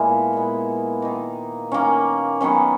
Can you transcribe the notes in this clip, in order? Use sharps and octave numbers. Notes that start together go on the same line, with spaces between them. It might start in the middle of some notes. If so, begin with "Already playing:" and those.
Already playing: A#2 G#3 B3 E4
A#2 G#3 B3
D#3 A#3 D#4
D#3 A#3 C#4
D#3 F#3 B3 C#4